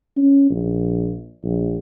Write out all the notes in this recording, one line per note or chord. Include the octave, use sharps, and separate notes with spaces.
C#4
A#1
A#1